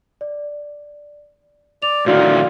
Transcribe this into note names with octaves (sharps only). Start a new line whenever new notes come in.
D5
D5 F7
A2 D3 D#3 F4 F#4 D5 F6